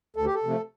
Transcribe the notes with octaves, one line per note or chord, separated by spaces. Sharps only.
D2 A4
G4
A4
C3 F3 A3